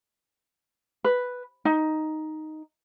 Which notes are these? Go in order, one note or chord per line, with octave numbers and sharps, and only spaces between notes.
B4
D#4